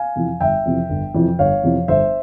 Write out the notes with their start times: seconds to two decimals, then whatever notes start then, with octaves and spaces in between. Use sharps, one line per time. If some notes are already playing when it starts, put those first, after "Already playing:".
Already playing: F5 G#5
0.16 F2 C3 E3
0.40 G1 E5 G5
0.66 F2 C3 E3
0.90 G1
1.14 F2 C3 E3
1.39 G1 C#5 F5
1.63 F2 C3 E3
1.88 G1 C5 E5